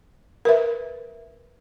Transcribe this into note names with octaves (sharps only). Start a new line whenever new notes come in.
A#4 B4 E5